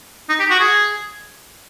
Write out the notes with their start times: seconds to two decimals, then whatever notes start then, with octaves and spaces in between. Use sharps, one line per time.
0.29 D#4
0.40 G4
0.50 F#4
0.60 G#4